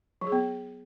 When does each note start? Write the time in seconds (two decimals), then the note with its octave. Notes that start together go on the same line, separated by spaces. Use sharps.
0.21 F#3
0.27 G#4
0.32 B3